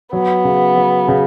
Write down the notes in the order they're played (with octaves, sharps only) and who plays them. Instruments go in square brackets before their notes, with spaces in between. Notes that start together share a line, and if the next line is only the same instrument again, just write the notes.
[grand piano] F#3 [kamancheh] B3
[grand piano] C#3
F#3
C#3